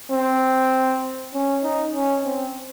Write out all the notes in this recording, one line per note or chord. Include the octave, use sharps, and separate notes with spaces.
C4
C#4
D#4
C#4
C4